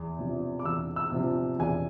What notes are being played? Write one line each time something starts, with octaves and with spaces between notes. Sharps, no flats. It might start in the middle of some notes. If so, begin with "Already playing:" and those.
Already playing: E2
C3 F3
D6
E2 E6
E6
C3 F3
E2 G#5